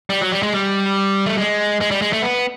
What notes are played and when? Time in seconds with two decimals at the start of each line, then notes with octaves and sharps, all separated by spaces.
0.10 G3
0.22 F#3
0.32 G3
0.43 G#3
0.53 G3
1.26 A3
1.38 G#3
1.81 G#3
1.91 G3
2.02 G#3
2.13 A3
2.22 B3